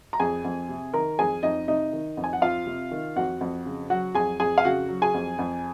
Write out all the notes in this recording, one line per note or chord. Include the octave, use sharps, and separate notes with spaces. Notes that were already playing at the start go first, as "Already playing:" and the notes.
A#5
F2 G#4 G#5
F2
C3
D#3 A#4 A#5
F2 G#4 G#5
F2 D#4 D#5
C3 D#4 D#5
D#3
F2
G#5
F#5
F2 F4 F5
C3
D#3
F2 F#4 F#5
F2
C#3
F#3 F#4 F#5
F2 G#4 G#5
F2 G#4 G#5
F5
C#3 F#4 F#5
F#3
G#4 G#5
F2
F2